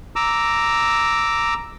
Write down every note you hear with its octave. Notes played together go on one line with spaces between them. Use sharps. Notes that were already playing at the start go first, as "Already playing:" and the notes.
A#5 D6 E6